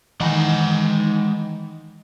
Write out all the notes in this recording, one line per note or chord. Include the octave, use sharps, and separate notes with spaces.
D#3 E3 G#3 D#4 D#5 F#5